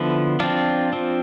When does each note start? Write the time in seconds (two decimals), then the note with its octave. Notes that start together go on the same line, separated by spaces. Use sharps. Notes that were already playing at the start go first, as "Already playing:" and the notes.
Already playing: D3 F3 B3 E4
0.40 F3 C4 D4 F4
0.93 F3 C4